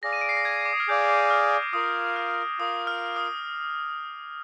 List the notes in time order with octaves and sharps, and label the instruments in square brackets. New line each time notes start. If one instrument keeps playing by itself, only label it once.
[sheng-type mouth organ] G#4 D5 F5 [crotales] A#6
[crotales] D#7
D7
C7
A#6
G#6
D6
D#6
F6
[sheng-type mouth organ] G#4 D5 F5 [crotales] G6
[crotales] F6
D6
[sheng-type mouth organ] F4 A#4 F5 [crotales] D#6
[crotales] F6
[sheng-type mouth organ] F4 A#4 F5 [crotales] D#6
[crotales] F6
D#6